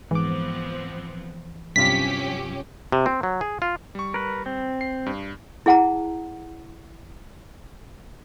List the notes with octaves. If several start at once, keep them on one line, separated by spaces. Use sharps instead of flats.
G#2 E3 F3 B3 C4 D6
G2 C3 F#3 C#4 F4 G4 B6
C3
C4
F#3
G#4
F4
G3 C#6
A#4 B4
C4
C7
G2
E4 G#4 F#5 A5 A#5